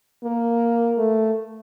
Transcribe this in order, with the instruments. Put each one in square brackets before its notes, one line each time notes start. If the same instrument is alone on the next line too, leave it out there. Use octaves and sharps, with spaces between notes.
[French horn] A#3
A3